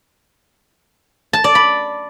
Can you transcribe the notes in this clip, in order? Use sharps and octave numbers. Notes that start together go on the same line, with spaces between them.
A5
D5
B5